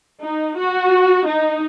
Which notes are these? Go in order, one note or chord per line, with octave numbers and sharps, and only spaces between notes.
D#4
F#4
D#4